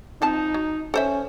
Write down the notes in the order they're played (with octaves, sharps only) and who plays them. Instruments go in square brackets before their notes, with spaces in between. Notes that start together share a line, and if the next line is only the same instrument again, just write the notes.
[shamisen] F3 C4 A5 [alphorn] D#4
[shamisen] F#3
[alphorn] C#4 [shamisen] A4 C5 E5